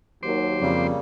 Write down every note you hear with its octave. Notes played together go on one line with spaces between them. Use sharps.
D#2 F#3 C5 C6 D6
F2 C#3 G3 A#3